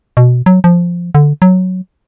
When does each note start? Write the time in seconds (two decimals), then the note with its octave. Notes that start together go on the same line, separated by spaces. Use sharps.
0.17 B2
0.46 F#3
0.64 F3
1.15 D3
1.42 F#3